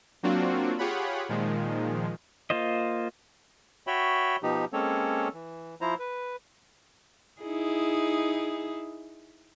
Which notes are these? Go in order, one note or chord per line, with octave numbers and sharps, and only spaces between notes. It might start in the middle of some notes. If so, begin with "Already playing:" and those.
F#3 A#3 C4 D4 F4 F#4
F4 G4 G#4 C#5 F#5 B5
A#2 D#3 F3 G#3
A#3 F4 C5 D#5
F#4 C#5 E5 G5 B5
B2 F3 D#4 G4
G#3 A#3 C4 C#4 A4 C#5
E3
F3 E4 C5 A#5
B4
D#4 E4 G#4